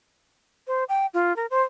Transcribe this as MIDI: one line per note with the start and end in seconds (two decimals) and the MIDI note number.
0.67 0.84 72
0.89 1.06 79
1.14 1.35 65
1.36 1.46 70
1.50 1.62 72